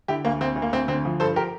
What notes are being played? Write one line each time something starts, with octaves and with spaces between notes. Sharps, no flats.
D3 E4 G4
D2 A#3
D2 C4
D2
A#3
D2 C4
D3 C4
F3
G2 A4 C5
G4 A#4